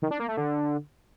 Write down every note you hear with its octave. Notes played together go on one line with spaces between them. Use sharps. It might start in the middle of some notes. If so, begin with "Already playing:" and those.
D#3
D4
A#3
A3
D3